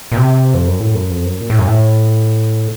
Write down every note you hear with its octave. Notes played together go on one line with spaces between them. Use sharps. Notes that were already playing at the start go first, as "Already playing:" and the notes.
A#2
C3
F2
F#2
A2
F#2
F2
F#2
A#2
A2
F#2
A2